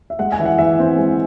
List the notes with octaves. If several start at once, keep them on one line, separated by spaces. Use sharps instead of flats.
E5
G#3 F#5
G#5
E3 E5
F#5
E3 E5
C4
G#3